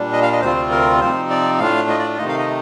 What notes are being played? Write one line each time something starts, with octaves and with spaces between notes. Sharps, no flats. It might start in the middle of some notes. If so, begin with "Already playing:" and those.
Already playing: A#2 G3 D4
D#5
F5
D#5
D2 C3 G3 C4 F4 C5
A#4
C3 F3 C4 D#4 C5
D5
A2 A3 D4 F4 F5
D#5
D5
C3 D#3 A3 D#4 D#5
F5
D#5